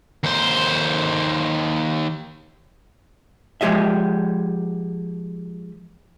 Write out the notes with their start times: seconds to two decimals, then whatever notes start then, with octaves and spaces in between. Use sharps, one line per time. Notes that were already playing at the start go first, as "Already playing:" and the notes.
0.23 D#2 C5
3.61 F3 G#3 G4 D#5 E5